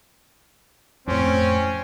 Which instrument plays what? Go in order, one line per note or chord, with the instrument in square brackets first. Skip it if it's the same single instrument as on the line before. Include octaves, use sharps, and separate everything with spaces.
[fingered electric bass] F2 A2 [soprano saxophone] C4 [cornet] C#4